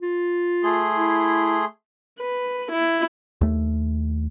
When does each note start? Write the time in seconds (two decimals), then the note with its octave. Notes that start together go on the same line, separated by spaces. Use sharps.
0.02 F4
0.63 A3 G#4 C6
0.96 E4
2.20 B4
2.72 E4
3.41 D#2 A3